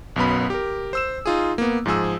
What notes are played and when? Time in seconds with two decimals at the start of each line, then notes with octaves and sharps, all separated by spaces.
0.16 B1 F#2 B3 B5
0.50 G4 A#4
0.93 C5 E6 E7
1.26 D#4 F4 G#4
1.58 A#3 B3
1.86 G#2 F3 G#4 E6